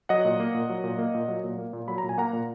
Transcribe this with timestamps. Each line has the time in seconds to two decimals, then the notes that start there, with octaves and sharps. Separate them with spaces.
0.09 F#3 D#5 F#5
0.25 A#2
0.40 A#3
0.54 A#2
0.69 F#3
0.84 A#2
0.99 A#3
1.15 A#2
1.28 F#3
1.44 A#2
1.58 A#3
1.73 A#2
1.88 F#3 B5
1.98 A#5
2.03 A#2
2.09 G#5
2.18 A#3 F#5 A#5
2.33 A#2